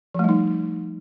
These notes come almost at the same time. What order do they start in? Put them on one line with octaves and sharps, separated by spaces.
F3 A3 G3 D#4